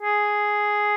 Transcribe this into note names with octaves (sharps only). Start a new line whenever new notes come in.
G#4